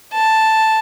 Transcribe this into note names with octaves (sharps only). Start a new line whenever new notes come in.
A5